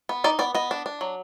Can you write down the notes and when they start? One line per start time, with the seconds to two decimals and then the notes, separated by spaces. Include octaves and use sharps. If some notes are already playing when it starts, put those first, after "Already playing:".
0.09 B3
0.24 D#4 D5
0.39 B3 D5
0.55 B3 D#5
0.71 D4
0.86 D4
1.01 F#3